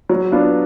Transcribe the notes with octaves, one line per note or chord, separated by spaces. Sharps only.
F#3
B3 D4 F4